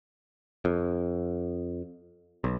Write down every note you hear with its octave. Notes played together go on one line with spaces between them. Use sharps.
F2
B1